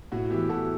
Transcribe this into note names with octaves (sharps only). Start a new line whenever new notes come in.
A2 F#4
E3 B3 E4 G4
A2 F#4 A4